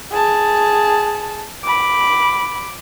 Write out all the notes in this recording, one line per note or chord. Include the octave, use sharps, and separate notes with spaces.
G#4 A5
B5 D6